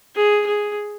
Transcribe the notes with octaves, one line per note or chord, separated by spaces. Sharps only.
G#4
G#4